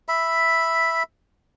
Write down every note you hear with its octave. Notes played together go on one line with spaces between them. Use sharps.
E5 B5